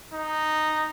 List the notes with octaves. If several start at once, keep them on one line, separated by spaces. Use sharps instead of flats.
D#4